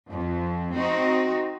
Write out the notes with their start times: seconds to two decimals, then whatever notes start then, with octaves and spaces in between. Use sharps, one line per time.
0.10 F2
0.76 C4 D#4 F#4